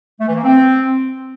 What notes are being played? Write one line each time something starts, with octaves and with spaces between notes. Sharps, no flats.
A3
E3
A#3
C4